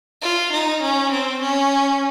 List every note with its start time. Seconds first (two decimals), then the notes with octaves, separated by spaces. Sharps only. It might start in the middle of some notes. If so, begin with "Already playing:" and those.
0.22 F4
0.52 D#4
0.82 C#4
1.11 C4
1.41 C#4